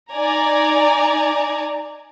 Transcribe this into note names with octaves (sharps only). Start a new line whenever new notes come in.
D#4 D5 G#5 A#5